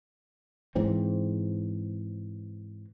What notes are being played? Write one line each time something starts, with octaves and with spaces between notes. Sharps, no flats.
G#2 E3 C4